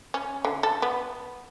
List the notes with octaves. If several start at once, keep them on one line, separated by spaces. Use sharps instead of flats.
C#4
D3
A4
B3